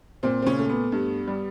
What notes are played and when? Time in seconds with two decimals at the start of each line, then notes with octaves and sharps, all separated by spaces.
0.23 A#2 C4
0.42 C4
0.46 C#3 C#4
0.58 A3
0.69 B3
0.92 G2
1.27 G3